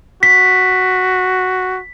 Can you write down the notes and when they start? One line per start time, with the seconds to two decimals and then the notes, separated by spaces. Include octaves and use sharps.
0.23 F#4 B6